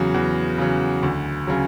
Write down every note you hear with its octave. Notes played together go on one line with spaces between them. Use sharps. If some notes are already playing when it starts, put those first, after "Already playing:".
Already playing: E2 C#3 F#3
E2
C#3 F#3
D2
C#3 F#3